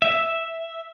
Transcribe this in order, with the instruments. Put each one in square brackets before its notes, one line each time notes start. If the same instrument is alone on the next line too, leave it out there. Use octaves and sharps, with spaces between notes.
[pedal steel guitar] E5